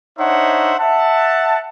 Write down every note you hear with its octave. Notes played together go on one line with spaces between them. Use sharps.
D4 D#4 C5 C#5 E5 F#5
E5 F#5 A5